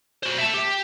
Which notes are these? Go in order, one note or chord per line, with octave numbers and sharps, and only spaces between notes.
F#4 C5
E5 A5
G4